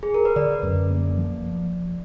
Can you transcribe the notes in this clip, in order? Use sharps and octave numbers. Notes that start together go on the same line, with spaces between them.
G#4
A#4
B4
D3 D5
F#2
A#3
F3